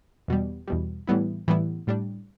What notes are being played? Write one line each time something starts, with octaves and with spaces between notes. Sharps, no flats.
E2 B2 G3
E2 B2 G3
A2 E3 G3 B3 E4
A2 E3 G3 B3 E4
A2 G3 D4